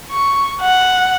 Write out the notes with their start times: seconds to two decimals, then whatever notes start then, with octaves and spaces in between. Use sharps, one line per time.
0.12 C#6
0.62 F#5